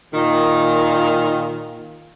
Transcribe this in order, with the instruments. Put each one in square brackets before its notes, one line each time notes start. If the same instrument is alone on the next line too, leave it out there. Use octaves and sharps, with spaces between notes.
[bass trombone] A#2 [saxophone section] D#3